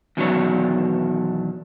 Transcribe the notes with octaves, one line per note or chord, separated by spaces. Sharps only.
E2 B2 D#3 F#3 D4 C#5